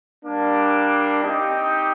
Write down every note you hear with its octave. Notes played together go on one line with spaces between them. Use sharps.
G3 A#3 D4
C4 D#4 G4